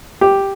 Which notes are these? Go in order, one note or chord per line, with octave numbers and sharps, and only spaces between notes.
G4